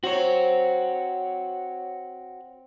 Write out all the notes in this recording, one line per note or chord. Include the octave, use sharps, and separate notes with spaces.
C4 F#4 C#5